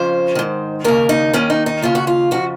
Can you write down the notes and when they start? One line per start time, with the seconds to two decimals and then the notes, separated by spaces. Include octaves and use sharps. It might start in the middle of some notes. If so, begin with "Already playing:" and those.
Already playing: F2 C#3 C5
0.35 G#2 D#3
0.84 D#2 C#3 A#4
1.09 D#4
1.33 D#2 D#3 C#4
1.50 D#4
1.66 D#4
1.82 D#2 C#3 F4
1.95 F#4
2.07 F4
2.31 F2 C#3 F#4